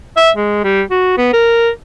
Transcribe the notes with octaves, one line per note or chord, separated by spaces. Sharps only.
E5
G#3
G3
F#4
B3
A#4